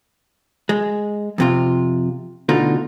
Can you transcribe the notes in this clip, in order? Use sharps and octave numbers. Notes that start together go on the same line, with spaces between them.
G#3
F2 C3 F4
D2 B2 D3 D#4 F4